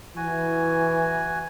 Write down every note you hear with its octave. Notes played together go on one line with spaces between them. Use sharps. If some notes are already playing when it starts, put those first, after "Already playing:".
E3 F#4 G#5